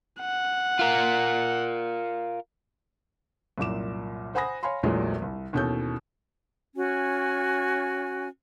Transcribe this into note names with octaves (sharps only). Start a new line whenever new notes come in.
F#5
F4 A#4
C2 F#2 A#2 D6 E7
C5 F#5 G#5 B5 D#6 A#6
C#5 F5 G#5 B5 C6
A#1 E2 A#2 F#3 G#3 A3
C2
D#2 B2 E3 C#4 A4 G6
C#4 F#4 G#5